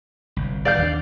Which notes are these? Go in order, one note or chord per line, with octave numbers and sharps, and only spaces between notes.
G1 C2
A#2 D#3 D5 F5 G6
D#2 E3 D4